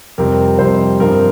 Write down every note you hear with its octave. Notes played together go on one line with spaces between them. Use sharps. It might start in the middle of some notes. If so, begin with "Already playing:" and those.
F2 C3 G3 C4 A#4
F2 C3 G3 C4 C5
G2 F3 C4 A#4